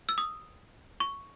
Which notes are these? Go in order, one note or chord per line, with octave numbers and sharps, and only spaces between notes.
E6
D#6
C#6